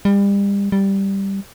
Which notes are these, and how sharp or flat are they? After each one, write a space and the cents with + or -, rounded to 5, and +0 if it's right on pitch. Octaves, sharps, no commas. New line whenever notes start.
G3 +35
G3 +0